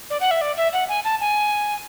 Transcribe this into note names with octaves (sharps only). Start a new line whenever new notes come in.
D5
F#5
E5
D5
E5
F#5
G#5
A5
G#5